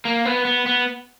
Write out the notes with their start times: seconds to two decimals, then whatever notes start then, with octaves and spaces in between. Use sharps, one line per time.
0.05 A#3
0.25 B3
0.45 B3
0.66 B3